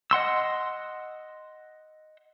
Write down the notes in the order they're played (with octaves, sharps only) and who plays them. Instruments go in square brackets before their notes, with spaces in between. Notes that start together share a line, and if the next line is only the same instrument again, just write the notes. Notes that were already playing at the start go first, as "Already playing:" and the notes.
[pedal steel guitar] D#5 F#5 C6 E6